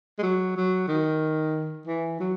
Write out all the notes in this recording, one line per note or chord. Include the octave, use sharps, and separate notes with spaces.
G#3
F#3
F#3
D#3
E3
F#3